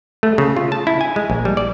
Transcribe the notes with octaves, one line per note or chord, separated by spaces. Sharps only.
A3
C#3
F4
A5
E4
G#5
G#3
A#1
G3
D5